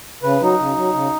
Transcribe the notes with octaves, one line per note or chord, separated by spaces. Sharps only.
C#3 B4
F#3 D#4
C#3
F#3
C#3